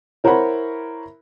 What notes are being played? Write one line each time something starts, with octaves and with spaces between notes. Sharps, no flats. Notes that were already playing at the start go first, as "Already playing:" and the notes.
E4 A#4 C5 C#5 F#5 B5